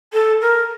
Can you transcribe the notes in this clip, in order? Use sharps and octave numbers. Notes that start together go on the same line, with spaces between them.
A4
A#4